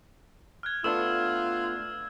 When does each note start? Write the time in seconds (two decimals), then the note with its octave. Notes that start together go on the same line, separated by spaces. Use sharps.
0.63 F6 F#6 G#6
0.84 A3 B3 D4 F4 E6 E7